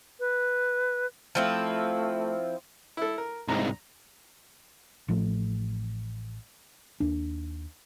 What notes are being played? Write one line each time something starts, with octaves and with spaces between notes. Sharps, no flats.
B4
F3 A3 C4 E4
E4 A4
A#4
C2 G#2 A#5
A1 A2 F3 A3
D#2 D4